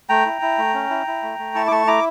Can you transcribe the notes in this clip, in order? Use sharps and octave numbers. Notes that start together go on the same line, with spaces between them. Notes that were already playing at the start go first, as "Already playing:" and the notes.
A3 G5 A#5
E4
E4
A3
C#4
E4
E4
A3
A3
E4 A5 C#6
D6
A3 A5 C#6
E4 A#5 D6